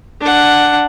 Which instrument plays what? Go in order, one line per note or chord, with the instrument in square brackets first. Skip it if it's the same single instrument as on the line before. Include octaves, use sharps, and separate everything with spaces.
[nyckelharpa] D4 F#5